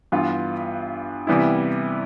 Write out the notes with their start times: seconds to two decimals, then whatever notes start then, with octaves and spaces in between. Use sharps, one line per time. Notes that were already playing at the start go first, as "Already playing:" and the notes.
0.12 G2 E3 B3 F4
1.27 C3 E3 G3 B3 E4